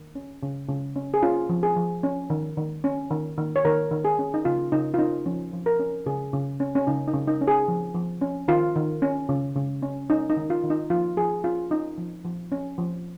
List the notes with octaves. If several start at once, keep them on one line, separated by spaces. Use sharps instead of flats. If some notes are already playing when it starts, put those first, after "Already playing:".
Already playing: D#3
C#4
C#3
C#3
C#4
G#4
C#4 F4
F3
G#4
F3
C#4
D#3
D#3
C#4
D#3
D#3
C#5
D#3 A#4
D#3
G#4
C#4
D#4
C#3 F4
C#3 D#4
F4
C#4 D#4
F3 C#4
F3
A#4
C#4
C#3 G#4
C#3
C#4
C#4
C#3 D#4
D#4
C#3
D#4
C#4
G#4
F3
F3
C#4
D#3 F4
D#3
C#4
C#3
C#3
C#4
C#4 D#4
D#4
D#3
F4
D#3
D#4
F3 F4
F3 G#4
C#4 F4
C#4 D#4
F3
F3
C#4
F3